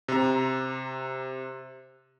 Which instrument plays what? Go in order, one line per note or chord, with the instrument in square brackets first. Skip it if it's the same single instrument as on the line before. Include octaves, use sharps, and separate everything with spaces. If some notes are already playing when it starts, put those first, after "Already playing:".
[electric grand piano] C3 A#5